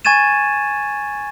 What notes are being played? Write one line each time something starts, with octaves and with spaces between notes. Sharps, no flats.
G#5 C#6 G#6 A6 D#7 E7